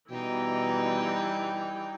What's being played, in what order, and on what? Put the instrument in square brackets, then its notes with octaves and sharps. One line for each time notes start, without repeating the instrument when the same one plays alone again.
[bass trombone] B2 [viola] E3 G3 [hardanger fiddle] D#4 G5